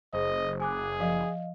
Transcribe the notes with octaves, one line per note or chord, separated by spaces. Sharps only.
F#1 G#4 C5 D#5
G#4 G#5 D6 F#6
F3 D#5 F5